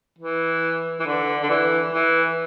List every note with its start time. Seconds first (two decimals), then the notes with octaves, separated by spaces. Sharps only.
0.18 E3
1.00 E3
1.06 D3
1.42 D3
1.50 E3
1.93 E3